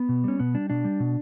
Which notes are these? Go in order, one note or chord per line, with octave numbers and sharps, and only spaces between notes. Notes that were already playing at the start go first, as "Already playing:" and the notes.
Already playing: B3
B2
G3 C#4
B2 B3
G3 D4
B2 D4
G3
B2